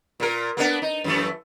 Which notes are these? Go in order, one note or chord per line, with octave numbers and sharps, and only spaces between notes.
A#2 A#4
A#3 B3 D4
D#4
F#2 E3 A3